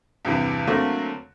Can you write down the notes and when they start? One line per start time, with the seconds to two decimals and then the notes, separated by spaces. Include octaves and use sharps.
0.25 E2 G2 C3 E3
0.67 D3 F#3 A3 A#3 C4